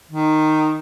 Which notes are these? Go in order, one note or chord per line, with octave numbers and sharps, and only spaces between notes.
D#3